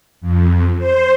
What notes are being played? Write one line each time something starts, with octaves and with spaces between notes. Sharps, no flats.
F2
C5